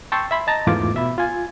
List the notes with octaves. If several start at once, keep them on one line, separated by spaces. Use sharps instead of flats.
G5 A5 C6 C#6 E6
E5 B5 C6
D#5 A5 A#5
E2 G#2 E3 A3 F4 D6
B2 E5 B5
F4 G#5